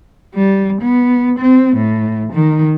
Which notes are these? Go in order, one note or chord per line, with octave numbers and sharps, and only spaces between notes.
G3
B3
C4
A2
D#3